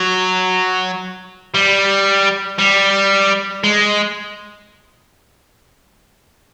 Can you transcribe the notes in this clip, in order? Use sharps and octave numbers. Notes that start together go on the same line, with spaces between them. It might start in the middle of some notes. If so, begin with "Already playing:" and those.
Already playing: F#3
G3
G3
G#3